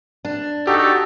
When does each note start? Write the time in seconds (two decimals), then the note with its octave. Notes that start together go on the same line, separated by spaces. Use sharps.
0.25 D4
0.67 D#4 F#4 G4 A4